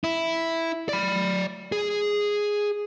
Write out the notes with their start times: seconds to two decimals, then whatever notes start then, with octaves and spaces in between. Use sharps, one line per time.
0.04 E4
0.89 D5 B5
1.72 G#4